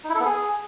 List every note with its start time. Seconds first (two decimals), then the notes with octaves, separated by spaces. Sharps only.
0.04 D#4
0.09 E4
0.15 A4
0.20 B3
0.25 G#4